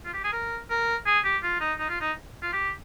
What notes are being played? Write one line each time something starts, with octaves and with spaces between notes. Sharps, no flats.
F4
G4
G#4
A#4
A#4
G#4
G4
F4
D#4
D#4
F4
D#4
F4
G4